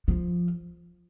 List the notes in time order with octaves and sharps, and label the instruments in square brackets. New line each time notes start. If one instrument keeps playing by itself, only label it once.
[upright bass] F3